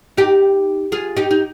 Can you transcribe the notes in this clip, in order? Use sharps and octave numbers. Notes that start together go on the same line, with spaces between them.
D#4 G4
F4 G#4
D#4 G4
D#4